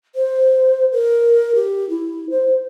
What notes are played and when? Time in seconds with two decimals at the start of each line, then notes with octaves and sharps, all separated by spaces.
0.15 C5
0.92 A#4
1.55 G4
1.90 E4
2.30 C5